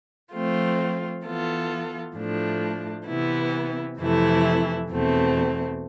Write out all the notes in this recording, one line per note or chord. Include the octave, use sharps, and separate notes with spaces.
F3 A3 C4 F4
E3 B3 F4 A4
A2 F3 A3 D4
C3 E3 B3 E4
F2 C3 E3 A3 E4
E2 B2 A3 C4